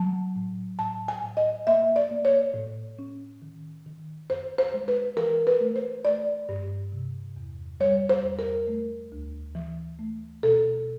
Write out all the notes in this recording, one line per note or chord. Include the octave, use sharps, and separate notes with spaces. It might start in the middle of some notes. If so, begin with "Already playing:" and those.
Already playing: F#3 A5
A2
A2 A5
G#5
A2
D#5
A#3 E5
D5
A#3
C#5
A2
C#4
D#3
D#3
F#2 C5
C5
G#3
B4
E3 A#4
B4
A3
C5
A3 D5
G2
C3
E2
G3 C#5
C5
E2
A#4
A3
D2
E3
A3
B2 A4